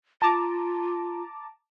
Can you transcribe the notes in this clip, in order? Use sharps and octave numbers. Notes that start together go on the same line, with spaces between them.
F4 A5 A#5 D6